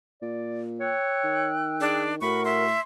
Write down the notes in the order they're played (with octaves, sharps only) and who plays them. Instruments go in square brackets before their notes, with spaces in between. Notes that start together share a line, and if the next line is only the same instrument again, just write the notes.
[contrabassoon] A#2 [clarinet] D5
[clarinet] C#5 [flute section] G5 E6 F#6
[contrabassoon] D#3
[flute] D4 [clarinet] G#4
[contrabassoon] A2 [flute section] F#4 A#4 F#5 [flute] B5 [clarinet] C#6
[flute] E5 [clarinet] C6